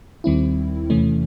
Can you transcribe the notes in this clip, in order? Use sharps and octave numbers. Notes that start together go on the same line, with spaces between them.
D#2 D#3 G3 C4 E4
E2 C3 E3 A3 C#4